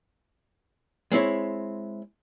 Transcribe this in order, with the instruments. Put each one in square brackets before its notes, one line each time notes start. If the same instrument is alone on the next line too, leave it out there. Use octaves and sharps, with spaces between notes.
[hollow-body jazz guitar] G#3 C4 E4 C#5